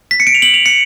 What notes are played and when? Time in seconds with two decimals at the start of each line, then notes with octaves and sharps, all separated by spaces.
0.11 B6
0.20 C#7
0.27 D7
0.35 F7
0.42 F#7
0.54 F7
0.66 C#7